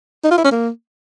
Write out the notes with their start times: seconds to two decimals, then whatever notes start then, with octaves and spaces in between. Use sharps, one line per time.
0.24 D#4
0.31 F4
0.38 E4
0.44 C#4
0.51 A#3